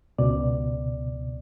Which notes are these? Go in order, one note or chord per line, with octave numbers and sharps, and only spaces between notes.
C#2 B2 D5